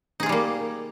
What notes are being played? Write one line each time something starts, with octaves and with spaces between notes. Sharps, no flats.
G3 A#3 D#4 F4 G#4